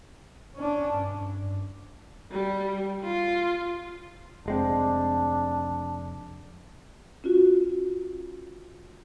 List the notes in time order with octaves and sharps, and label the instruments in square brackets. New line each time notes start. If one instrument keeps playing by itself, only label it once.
[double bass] C#4 D4
G2
[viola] G3
F4
[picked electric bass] F1 G#3 C4 [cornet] D4
[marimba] C#4 F4 F#4